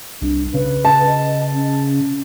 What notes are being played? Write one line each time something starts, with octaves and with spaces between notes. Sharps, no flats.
C2 D4
C#3 B4
A5
D#5
C#4